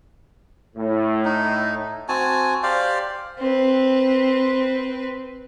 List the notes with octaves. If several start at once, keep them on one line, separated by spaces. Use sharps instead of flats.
A2
D#4
C4 F#4 G#5 A5
G4 C5 D5 F5
C4 B4